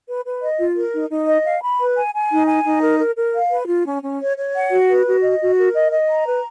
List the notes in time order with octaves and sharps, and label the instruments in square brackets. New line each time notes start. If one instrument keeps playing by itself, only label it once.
[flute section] B4
B4
D#5
F4
A#4
D#4
D#4
D#5
F5
B5
B4
G#5
G#5
D#4
G#5
D#4
A#4
A#4
A#4
F5
B4
F4
C#4
C#4
C#5
C#5
F#5
F#4
B4
F#4
D#5
F#4
A#4
D#5
D#5
A#5
B4